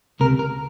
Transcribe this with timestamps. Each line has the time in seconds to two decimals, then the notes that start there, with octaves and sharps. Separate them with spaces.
0.20 C#2 C3 A#4
0.39 A#4